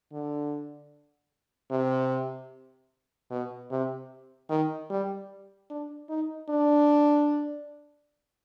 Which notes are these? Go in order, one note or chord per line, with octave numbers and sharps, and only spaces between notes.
D3
C3
B2
C3
D#3
G3
D4
D#4
D4